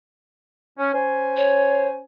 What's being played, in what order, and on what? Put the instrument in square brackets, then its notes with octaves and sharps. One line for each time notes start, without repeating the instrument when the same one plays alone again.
[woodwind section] C#4
C#4 C5 G#5
[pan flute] C#5